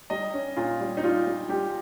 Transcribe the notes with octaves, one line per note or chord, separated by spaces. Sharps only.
G3 D#5
C#4
A#2 F4
G3
D#4
G3 F4
G3
G3 G4